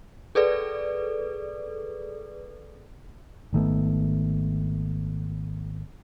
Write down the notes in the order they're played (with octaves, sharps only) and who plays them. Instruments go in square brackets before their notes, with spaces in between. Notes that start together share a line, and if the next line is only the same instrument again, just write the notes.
[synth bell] G#4 A4 B4 D5
[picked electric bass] G#1 D#3 A3 B3